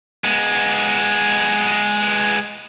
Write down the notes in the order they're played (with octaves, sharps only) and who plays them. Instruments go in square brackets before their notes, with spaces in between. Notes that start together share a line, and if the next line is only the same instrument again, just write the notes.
[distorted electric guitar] G#3 B3